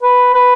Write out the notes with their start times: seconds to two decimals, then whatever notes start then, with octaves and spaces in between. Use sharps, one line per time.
0.02 B4
0.34 B4